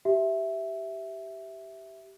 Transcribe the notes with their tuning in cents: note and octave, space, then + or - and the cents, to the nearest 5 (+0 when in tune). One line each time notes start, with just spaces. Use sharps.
G4 -15 E5 +0